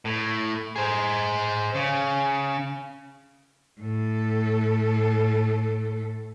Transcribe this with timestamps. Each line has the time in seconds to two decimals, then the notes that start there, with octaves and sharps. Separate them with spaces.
0.05 A2
0.76 G#4 C5
1.75 C#3
3.81 A2 A4